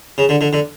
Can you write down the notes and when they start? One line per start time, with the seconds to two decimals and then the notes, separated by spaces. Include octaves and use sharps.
0.18 C#3
0.29 D3
0.41 D3
0.53 D3